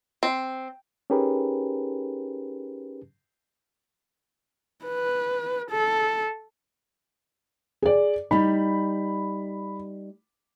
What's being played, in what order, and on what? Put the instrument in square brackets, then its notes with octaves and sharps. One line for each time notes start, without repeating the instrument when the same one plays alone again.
[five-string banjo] C4
[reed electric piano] C#4 D#4 G4 G#4 A#4 B4
[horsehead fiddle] B4
A4
[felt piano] G#4 D5
[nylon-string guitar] G3 D#4 [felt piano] B5